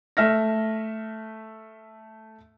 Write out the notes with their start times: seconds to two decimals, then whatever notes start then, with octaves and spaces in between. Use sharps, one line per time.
0.17 A3 E5 F6 A#6